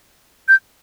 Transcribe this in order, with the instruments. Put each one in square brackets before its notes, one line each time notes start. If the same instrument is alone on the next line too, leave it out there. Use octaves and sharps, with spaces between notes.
[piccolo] G6